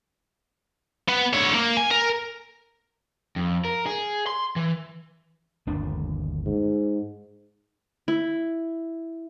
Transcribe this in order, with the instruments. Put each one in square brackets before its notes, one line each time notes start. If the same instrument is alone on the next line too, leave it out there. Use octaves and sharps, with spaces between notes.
[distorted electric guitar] B3
D3 C#5
A#3
G#5
A#4
[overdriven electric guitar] F2
A#4
G#4
C6
E3
[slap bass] G1 D#2 D4
[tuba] G#2
[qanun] E4